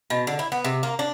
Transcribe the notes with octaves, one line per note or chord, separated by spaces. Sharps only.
B2
D3
E4
B3
C3
A#3
D4